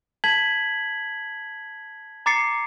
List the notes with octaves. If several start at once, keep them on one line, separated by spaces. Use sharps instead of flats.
A5 G#6 B6 F#7
A#5 D6 A6 C7 C#7